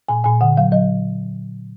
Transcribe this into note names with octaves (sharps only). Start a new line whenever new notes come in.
A#2 G#5
A#2 G#5
D3 F#5
F#3 F5
F#3 D#5